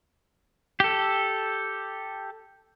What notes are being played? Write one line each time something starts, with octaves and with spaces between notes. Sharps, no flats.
G4 A4